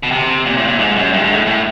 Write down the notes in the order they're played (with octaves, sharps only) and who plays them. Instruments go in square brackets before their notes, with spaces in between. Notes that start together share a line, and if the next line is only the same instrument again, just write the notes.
[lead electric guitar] B2
C3
A#2
A2
A#2
G#2
F#2
G2
G#2
A2
A2